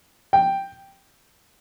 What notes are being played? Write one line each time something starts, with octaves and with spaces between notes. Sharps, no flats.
G5